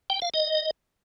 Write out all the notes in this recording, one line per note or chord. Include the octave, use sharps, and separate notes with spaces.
G5
F5
D#5